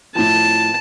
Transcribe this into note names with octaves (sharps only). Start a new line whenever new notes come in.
A2 F3 A5